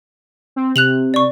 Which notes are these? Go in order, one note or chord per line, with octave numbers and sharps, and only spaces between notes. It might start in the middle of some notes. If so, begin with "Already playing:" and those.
C4
C3 F#6 F7 F#7
D5 C#6